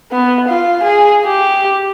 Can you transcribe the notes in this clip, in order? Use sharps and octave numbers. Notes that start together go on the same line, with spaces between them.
B3
F4
G#4
G4